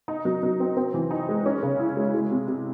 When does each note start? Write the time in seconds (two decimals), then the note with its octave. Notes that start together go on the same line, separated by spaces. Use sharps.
0.08 D#4
0.25 F#3
0.43 F#3
0.60 C4
0.77 C4
0.94 E3
1.11 D#4
1.29 G#3
1.46 C#4
1.63 C#3
1.80 E4
1.97 G#3
2.14 G#3
2.31 C3
2.47 C3